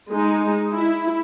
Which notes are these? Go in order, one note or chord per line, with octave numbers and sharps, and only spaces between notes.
G#3 D#4
E4